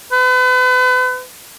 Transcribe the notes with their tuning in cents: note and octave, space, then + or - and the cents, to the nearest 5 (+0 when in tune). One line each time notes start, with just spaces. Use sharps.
B4 +40